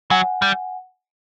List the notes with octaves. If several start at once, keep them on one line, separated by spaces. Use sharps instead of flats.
F#3 F#5 G#5
G3